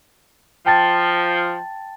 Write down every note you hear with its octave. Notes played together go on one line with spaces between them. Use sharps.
F3 G5 A5 A6